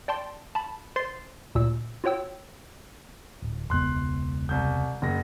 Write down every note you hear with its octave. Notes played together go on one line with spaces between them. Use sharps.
D5 G5 A5 C6
A5 B5
C5 C6 A6 C7
D2 A#2 E6
F4 F#4 C#5 G5 E6
D1
E1 C#2 B3 C6 F#6
C2 G6
F#1 A#6